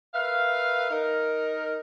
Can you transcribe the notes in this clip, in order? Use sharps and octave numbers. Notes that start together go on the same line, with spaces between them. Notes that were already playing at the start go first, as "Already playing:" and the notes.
A#4 B4 E5 F5
D#4 A#4